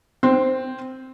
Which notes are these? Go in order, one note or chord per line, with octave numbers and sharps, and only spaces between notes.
C4